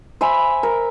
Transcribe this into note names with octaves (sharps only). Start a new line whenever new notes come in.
C5 E5 G#5 B5
A#4